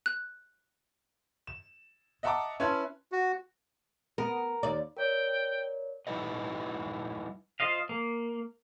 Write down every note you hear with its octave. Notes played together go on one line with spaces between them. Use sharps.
F#6
E7
D#5 E5 F#5 A5 A#5 D6
C#4 E4 B4 A5 C6 G#6
F#4
B3 A#4
D#2 D5
A#4 C#5 D5 G5
G3 D#4 E4 B4 D#5
F4 C5 D#5 F5
A#3